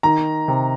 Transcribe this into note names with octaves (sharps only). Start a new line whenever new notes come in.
D#3 A#5
C3